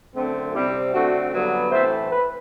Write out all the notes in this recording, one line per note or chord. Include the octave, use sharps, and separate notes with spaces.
F#2 D3 A3 C4
C3 G3 C4 E4 G4
D3 A3 C4 D4 F#4
G2 D3 F#3 B3
A2 E3 A3 C4 C5 E5
B4